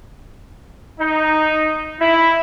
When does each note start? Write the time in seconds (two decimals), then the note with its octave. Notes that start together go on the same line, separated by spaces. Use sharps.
0.99 D#4
1.99 E4